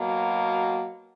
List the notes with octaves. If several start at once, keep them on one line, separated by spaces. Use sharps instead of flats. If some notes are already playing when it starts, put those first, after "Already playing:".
Already playing: B2 F#3 A#3